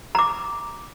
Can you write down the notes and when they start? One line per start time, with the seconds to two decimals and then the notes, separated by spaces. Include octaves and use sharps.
0.15 A#5 D6